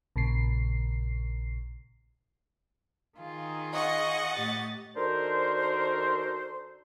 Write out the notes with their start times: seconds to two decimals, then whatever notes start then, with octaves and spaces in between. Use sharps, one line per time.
0.16 A#1 A#2 C#3 C7
3.18 D#3 F4 G#4
3.74 D#5 F#5 C#6
4.32 A2 G4 A6
4.96 D#3 D4 F#4 A4 A#4 C5